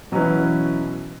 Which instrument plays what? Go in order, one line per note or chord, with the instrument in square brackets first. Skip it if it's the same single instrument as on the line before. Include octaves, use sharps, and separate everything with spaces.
[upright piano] B2 F#3 C#4 E4 B4 [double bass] E3